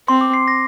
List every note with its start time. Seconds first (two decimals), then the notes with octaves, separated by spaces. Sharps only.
0.08 C4 C6
0.21 D6
0.34 C7
0.48 A#6